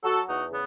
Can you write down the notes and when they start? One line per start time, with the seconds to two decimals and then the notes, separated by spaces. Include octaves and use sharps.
0.03 F#3 F#4 A4
0.27 E2 D#4 F#4
0.51 C#3 B3